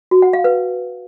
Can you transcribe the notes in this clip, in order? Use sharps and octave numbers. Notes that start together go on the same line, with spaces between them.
F#4
F#5
F5
B4